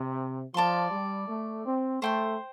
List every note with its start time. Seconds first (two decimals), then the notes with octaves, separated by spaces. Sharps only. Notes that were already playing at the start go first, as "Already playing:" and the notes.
Already playing: C3
0.54 F3 D5 A5 C6
0.91 G3
1.28 A3
1.65 C4
2.02 A3 C5 G5 C6